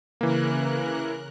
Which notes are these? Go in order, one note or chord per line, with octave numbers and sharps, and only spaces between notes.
C#3 E3 A#3 A#4 F#6